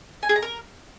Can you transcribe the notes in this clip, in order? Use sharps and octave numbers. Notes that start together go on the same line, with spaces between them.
G#5
G#4
A#5
A#4